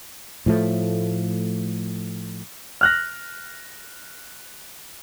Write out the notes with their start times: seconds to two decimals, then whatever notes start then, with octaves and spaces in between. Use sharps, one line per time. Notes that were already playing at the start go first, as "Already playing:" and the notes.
0.46 A2 F3 A3
2.81 F6 F#6 A#6